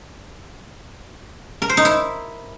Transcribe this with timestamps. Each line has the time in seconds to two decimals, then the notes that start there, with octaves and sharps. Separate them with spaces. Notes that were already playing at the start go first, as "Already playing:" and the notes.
1.62 A#4
1.69 C5
1.77 D#4
1.85 E4